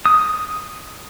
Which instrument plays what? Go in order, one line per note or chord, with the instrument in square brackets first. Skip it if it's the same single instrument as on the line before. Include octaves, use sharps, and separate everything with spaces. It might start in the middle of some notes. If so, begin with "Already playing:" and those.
[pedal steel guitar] D#6